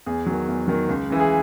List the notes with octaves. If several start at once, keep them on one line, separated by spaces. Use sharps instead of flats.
E2 G#4
D#3 F#3
E2
D#3 F#3
C#2
C#3 E3
G#4